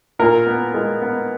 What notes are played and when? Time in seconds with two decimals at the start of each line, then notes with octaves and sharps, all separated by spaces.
0.19 A#2 A#4
0.47 B3
0.74 G#3
1.02 B3